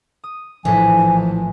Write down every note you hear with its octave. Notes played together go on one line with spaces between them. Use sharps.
D#6
A#1 A2 E3 F3 G#5 B6